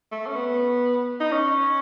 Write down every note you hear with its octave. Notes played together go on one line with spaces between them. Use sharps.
A3
C#4
B3
D#4
C#4